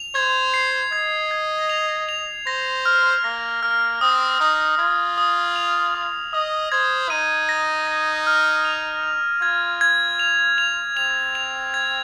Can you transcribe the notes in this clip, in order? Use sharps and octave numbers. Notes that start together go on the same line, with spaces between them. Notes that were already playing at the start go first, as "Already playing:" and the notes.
Already playing: F7
C5 G#6
C7
D#5 G#6
G#6
F7
F7
C5 A#6
F6
A#3 A#6
A#3 F6
C4 D#6
D#4 D#6
F4 G#6
D#6
F7
D#6
D#5 D#6
C5 G#6
D#4 D#7
A#6
A#6
F6
F7
F7
F4 G#6
G#6
F7
F7
C4 F7
F7
G#6